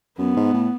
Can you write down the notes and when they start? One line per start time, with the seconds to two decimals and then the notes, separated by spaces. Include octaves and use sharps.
0.18 F#2 B3
0.36 G#2
0.53 A2